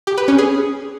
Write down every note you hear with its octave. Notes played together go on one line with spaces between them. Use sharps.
G4
B4
C#4
G#4